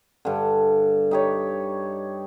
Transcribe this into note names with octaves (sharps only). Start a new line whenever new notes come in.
G2 D3
D#4 G4 C#5